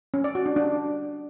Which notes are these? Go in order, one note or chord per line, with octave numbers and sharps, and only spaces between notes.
C#4
D5
F#4
D4
D4